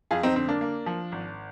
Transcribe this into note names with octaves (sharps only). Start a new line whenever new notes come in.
F2 F4 G#4
C4 D#4
D3 C4
A#3 D4
A#3
F3
G#1